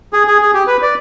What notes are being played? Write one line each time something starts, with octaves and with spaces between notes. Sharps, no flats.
G#4
G#4
G#4
G4
B4
D5